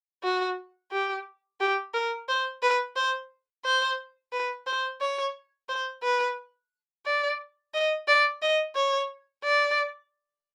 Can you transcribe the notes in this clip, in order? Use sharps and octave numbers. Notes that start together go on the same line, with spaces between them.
F#4
G4
G4
A#4
C5
B4
C5
C5
B4
C5
C#5
C5
B4
D5
D#5
D5
D#5
C#5
D5